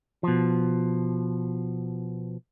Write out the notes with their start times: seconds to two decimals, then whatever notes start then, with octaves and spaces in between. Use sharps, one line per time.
0.23 B2 F3